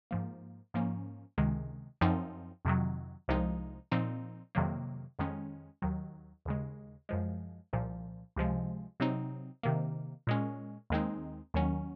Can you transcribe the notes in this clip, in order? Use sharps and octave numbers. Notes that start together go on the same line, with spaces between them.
G#2 F3 A#3
G#2 F3 A#3 C#4
C#2 C3 D#3 G#3
F#2 F3 C4 D#4
F2 C3 D#3 F#3
C2 C3 F3 G#3 D#4
A#2 F3 C4 D#4
F2 C3 D#3 F#3 A#3
F2 D#3 G#3 C#4
D#2 D#3 F#3
D#2 C#3 G#3
F#2 F3 G#3
C2 A#2 F3
C#2 C3 F3 G#3
C3 F#3 C4 D#4
C3 D#3 A#3
A#2 G#3 C#4
D#2 D#3 G#3 C4 D#4
D#2 D#3 F#3 C#4